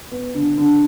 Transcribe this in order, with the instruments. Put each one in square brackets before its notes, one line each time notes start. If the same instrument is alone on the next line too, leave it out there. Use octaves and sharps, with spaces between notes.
[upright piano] B3
D3
D3